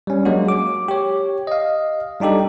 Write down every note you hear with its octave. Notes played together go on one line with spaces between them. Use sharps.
G3 C#4
F#3 G#3 A#3 D4 F#4
D6
G4 C#5
D#5 F5
G3 D4 D#4 G4 A4